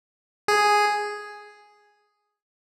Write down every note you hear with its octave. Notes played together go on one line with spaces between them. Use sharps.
G#4